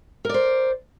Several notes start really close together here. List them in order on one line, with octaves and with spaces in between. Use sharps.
A#4 D5 C5